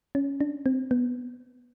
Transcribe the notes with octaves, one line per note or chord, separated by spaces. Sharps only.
C#4
D4
C4
B3